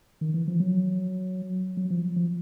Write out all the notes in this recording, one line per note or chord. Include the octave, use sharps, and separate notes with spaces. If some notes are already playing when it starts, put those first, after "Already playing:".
D#3
E3
F3
F#3
F#3
F3
F3